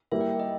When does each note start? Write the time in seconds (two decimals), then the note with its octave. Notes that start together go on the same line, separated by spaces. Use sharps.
0.12 G3 A#3 E4 G4 E5
0.21 G5
0.30 E5
0.40 D#5